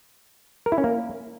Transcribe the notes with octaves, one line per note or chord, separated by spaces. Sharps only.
A#4
E4
C#4
A#3